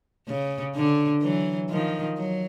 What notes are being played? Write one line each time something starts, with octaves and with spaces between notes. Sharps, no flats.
C#3
D3
E3 F#3
D#3 F3
F#3